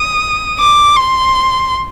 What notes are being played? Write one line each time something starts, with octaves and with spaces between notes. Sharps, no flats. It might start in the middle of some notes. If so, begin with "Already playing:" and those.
Already playing: D#6
D6
C6